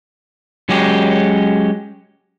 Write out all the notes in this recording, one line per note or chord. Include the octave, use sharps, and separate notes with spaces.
F#3 G#3 C#4 G4